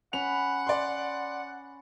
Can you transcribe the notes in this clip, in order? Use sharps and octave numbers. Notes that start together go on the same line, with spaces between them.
C#4 F#5 B5 F7
D5 C6